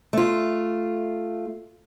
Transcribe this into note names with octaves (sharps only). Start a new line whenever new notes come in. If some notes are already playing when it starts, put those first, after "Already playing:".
A3 F4